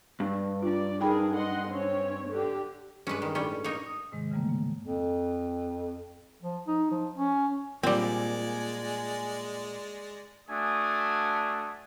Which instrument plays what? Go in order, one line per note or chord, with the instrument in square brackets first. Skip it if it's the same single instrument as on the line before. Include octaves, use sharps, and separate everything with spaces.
[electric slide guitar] G2
[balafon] D4 F4 [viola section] D5
[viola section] D4 G#4 A#4 [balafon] D#4 G5 B5
[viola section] D#5 F#5 C6
C4 C#4 C#5
D3 D4 G4
[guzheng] G2 G#3 [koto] C#4 B4
[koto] D#3
A2 G3 C#4
[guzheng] A#3 [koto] D#4 C#5
[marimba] D#6
G#2 C3 D#3 G#3
C#3 E3 G3 A3 A#3
A#3
[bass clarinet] F2
F3
D#4
F3
C#4
[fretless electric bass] A#2 [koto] G3 C4 [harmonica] G#3 D5 [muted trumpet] G#5
[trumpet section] A3 D4 F#4 G#5 D#6